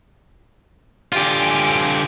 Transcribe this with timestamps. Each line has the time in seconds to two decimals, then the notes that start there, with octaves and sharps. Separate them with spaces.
1.12 D3 F4 G4 G#5